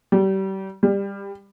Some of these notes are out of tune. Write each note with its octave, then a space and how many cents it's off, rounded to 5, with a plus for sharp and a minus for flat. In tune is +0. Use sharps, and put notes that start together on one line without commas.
G3 -30
G3 +20